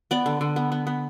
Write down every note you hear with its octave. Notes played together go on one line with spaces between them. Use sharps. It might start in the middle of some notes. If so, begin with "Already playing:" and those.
B3 D5
D3
D3
B3
B3
B3